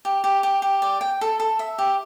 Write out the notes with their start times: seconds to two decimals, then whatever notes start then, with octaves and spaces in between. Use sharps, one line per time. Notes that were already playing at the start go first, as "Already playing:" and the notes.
0.05 G4
0.24 G4
0.43 G4
0.62 G4
0.82 D5
1.01 G5
1.21 A4
1.40 A4
1.59 E5
1.78 G4